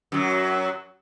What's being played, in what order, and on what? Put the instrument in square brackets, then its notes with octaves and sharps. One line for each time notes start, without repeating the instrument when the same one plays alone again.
[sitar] F#2 F#3